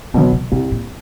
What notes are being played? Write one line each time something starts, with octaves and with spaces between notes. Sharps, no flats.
B2 D3 F#3
C3
C2 B2
A#2